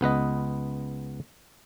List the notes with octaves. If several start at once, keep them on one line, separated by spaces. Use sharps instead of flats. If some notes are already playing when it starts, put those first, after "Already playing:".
C#2 B3 B4 D#5